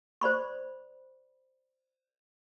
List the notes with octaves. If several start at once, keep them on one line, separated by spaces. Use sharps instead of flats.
C5 D5 B5 C#6